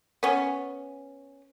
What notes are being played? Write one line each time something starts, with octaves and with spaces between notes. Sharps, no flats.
B3 C#4